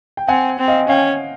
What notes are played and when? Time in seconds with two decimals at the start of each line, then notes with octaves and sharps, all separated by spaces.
0.17 G5
0.28 C4 F#5 G#5
0.59 C4
0.68 D#5 F5
0.88 C#4 F5 G5